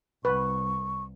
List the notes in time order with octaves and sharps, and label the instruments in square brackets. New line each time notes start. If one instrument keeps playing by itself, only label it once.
[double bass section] C2 [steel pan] B4 [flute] C#6